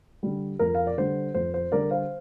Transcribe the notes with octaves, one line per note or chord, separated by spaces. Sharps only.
D3 G3
F2 A#4
F5
D5
D3 G3 C5
F2 C5
C5
D3 G3 A#4 D5
C5 F5